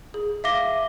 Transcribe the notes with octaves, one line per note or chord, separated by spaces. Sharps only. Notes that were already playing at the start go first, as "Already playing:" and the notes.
G#4
E5 F5 D6 A#6 G7